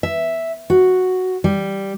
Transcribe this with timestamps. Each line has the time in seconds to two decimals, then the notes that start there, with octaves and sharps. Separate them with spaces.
0.03 E5
0.70 F#4
1.44 G3